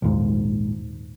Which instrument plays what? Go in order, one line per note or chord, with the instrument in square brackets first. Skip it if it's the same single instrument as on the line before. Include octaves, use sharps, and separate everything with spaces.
[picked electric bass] A#1 D#2 G#2